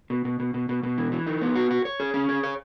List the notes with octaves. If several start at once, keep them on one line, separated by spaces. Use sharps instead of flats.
B2
B2
B2
B2
B2
B2
E3
E3
D#4
B3
F#4
F#4
C#5
G#4
C#4
G#4
C#5